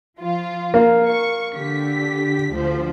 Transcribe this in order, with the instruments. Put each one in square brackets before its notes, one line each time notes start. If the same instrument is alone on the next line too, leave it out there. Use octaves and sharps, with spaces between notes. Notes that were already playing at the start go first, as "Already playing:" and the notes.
[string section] F3 F4
[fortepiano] A#3
[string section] C#6
D3 G4 B6
D2 F3 C5